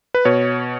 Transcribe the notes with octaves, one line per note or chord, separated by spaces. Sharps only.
B4
B2 C#5